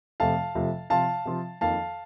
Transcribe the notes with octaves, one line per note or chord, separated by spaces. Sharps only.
F2 C3 F3 A3 F5 A5
F2 C3 F3 A3
C3 F3 C4 F4 F5 A5
C3 F3 C4 F4
F2 D#3 A#3 F5 A5